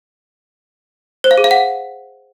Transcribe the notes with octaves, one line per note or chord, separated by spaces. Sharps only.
C5
F5
G#4
F5
F#5